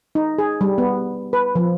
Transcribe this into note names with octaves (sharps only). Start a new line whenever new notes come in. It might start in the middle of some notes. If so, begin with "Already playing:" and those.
D#4
G#4
G3
B3
B4
F3